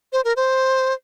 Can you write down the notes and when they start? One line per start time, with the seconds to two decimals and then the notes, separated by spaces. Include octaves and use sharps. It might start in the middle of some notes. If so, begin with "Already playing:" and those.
0.13 C5
0.25 A#4
0.37 C5